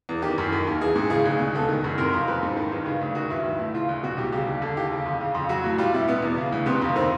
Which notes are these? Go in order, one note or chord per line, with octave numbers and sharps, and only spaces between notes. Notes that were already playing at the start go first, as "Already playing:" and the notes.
E2
D#3 G4
F#2
D#3
D#2
E3 G#4
G#2
C#3 G#4
D2
B2
C#2 A4
D#3
F#2
C3 A#4
F2
F3 B4
G#2
D#3
G2
C#3
D2
D#3 F#4
G2 E4
E3
A2
C#3 F4
D2
B2 F#4
C2 G4
C#3 G4
D#2
D3
D#2 G4
C#3
F2
C#3
F2
F#3 F#4
A2
G3 F4
B2 E4
B2 B3
E2
C#3
D2
C3 B3
F2
D#3 C4